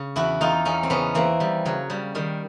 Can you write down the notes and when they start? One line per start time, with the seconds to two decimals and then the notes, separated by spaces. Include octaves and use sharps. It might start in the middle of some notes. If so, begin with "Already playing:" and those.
Already playing: C#3
0.16 E2 E4 F#4
0.41 E2 D#4 F4
0.65 E2 C#4 D#4
0.83 C4
0.90 C#3 B3 C#4
1.15 E3 A#3 C4
1.40 E2 G3
1.65 C#3 F#3
1.90 C#3 G3
2.15 D#3 G3